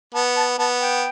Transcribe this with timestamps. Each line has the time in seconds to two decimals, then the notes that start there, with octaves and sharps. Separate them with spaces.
0.14 B3 A5
0.36 A5
0.58 B3 A5
0.80 G5